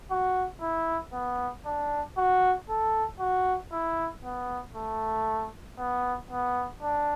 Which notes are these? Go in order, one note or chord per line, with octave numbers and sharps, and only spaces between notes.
F#4
E4
B3
D4
F#4
A4
F#4
E4
B3
A3
B3
B3
D4